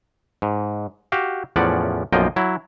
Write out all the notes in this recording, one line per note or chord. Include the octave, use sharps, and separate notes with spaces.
G#2
F#4 G4 F5
E2 A2 F3 C#4 D5 F#5
B1 F#2 F3 A#3 D#5 G5
F#3 E4